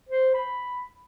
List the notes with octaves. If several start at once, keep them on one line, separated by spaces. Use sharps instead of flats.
C5
B5